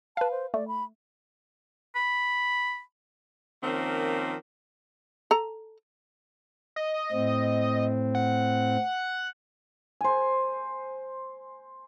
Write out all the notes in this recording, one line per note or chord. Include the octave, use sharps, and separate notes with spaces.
B4 F5 A5
C5
A3 D5
B5
B5
D#3 F3 A#3 C4 C#4
A4 A#5
D#5
A2 C4
F#5
C5 G#5